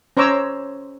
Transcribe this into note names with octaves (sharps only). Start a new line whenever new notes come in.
C#4 C5 C#5 A#5 D6 E6